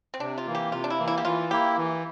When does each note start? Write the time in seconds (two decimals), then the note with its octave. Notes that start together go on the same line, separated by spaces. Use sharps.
0.14 C4
0.20 C3 D4
0.38 F4
0.47 E3 A#3
0.55 G4
0.72 C3 F4
0.84 D4
0.90 E4
0.99 E3 A#3
1.08 E4
1.18 G4
1.25 E3 F4
1.51 A#3 E4 G4
1.77 E3